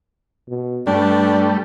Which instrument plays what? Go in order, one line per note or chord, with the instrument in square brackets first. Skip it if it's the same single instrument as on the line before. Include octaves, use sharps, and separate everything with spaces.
[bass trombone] B2
[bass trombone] G2 [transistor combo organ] G3 A3 [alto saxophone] D4